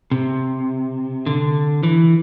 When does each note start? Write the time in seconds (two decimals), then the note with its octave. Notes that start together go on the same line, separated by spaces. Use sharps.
0.11 C3
1.26 D3
1.83 E3